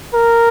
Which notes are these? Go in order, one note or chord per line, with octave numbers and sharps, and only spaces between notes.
A#4